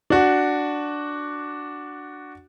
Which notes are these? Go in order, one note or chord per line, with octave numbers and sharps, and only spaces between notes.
D4 F#4